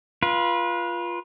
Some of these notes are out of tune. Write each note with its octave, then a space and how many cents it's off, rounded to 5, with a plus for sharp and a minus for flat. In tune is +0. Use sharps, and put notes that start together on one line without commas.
F4 -5 B4 -30